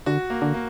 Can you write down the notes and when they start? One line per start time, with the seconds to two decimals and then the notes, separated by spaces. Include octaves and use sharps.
0.06 D3 F#4
0.30 A#3
0.42 D3
0.54 A#3